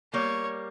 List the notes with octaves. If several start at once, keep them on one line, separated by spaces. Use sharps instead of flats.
G3 A#3 C#5